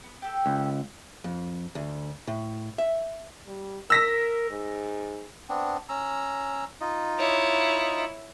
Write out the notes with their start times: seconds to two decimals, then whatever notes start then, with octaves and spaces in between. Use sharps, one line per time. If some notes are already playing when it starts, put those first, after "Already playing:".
0.04 B3
0.22 G4 A4
0.46 C#2
1.24 F2
1.75 D2
2.27 A2
2.78 E5
3.47 G3
3.90 A#4 E6 A#6 B6
4.51 G#2
5.49 B3 C4 D4
5.89 C#4 A#5 E6
6.81 D#4 F4 D#5
7.18 E4 C#5